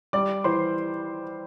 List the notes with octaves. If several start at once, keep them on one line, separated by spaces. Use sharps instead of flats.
G3 D5 D6
E3 C5 C6